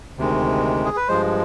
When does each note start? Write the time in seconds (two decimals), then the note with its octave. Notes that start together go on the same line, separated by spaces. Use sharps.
0.17 D2 C3 D#3 G#3
0.85 G#4
0.97 B4
1.08 G2 F3 G#3 C5